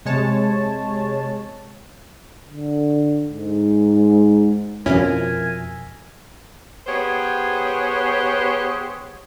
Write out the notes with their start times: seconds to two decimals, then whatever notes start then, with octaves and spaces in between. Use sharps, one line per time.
0.05 C3 G#3 C#5 A5
2.50 D3
3.30 G#2
4.86 F2 B2 F3 C#4 E4 A#4 E5 G#5
6.87 B3 G4 G#4 C5 C#5